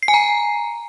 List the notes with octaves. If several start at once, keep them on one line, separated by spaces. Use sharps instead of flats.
C7
G#5
A#5